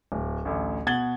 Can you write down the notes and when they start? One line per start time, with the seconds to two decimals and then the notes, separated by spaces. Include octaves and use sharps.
0.12 D1
0.45 A1 D2
0.86 B2 F#5 G#6 A6 F#7 G7